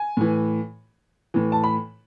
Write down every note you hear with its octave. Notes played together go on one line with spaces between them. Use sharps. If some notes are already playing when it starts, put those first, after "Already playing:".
Already playing: G#5
A2 E3
A2 E3
A5
B5